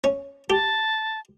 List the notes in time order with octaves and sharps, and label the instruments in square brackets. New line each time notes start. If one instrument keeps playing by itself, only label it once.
[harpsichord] C#4
[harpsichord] G4 [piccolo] A5